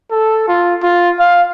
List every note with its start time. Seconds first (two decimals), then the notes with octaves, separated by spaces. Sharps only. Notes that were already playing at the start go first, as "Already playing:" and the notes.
0.11 A4
0.48 F4
0.83 F4
1.19 F5